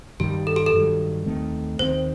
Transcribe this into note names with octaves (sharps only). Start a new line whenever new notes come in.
G2 D#3 G3 G4
A4
G4
A4
G2 D#3 F#3
D#2 D#3 A3 C4
D#2 D#3 A3 C4 C5